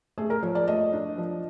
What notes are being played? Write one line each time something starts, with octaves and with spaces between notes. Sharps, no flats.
A3 G#4
A#4
F3 C#5
D5
A3 D#5
D4
F3